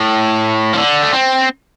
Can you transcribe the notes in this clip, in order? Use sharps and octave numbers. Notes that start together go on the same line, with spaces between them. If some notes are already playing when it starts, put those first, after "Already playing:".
Already playing: A2
F3
D3
A3
C4